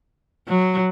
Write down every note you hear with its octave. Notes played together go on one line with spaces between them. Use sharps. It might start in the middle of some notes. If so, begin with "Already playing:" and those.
F#3